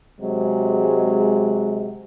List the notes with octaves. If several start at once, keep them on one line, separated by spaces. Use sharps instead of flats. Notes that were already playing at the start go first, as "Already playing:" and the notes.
C3 F#3 G#3